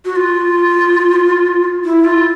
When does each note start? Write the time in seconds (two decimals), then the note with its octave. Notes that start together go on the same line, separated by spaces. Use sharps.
0.05 F#4
0.16 F4
1.84 E4
2.05 F4